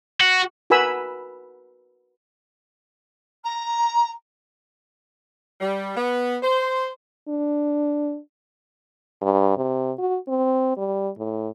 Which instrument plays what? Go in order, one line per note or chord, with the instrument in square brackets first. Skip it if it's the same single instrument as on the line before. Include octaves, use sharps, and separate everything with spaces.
[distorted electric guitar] F#4
[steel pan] F#4 A#4 B4 G#5 B5 E6
[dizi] A#5
[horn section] G3
B3
C5
[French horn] D4
G2
C3
F#4
C4
G3
A2